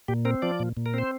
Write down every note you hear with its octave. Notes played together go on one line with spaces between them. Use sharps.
A#2 G4
C4 A#4
F3 D5
A#2
A#2
A#4
C4 C5